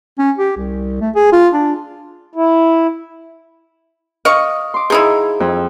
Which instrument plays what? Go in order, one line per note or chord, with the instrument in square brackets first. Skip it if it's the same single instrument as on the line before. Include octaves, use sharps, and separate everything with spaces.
[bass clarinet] C#4
G4
C2
A3
G#4
F4
D4
[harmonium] E4
[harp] D#5 [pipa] F5 C#6
[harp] C6 D6
[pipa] F3 D#4 E4 [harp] G#4
[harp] F2